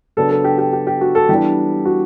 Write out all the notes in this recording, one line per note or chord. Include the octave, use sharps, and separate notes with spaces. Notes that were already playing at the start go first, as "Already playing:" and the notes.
C#3 F#3 B3 D4 A4
A4
G4
G4
G4
G4
F#4
A4
E3 G3 B3 D4 G4
F#4